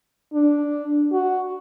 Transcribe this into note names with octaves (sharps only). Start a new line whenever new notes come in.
D4
F#4